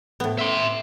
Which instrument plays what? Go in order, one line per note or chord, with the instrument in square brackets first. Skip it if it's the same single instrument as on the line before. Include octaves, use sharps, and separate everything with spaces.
[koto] A2 B3
[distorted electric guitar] E5 C6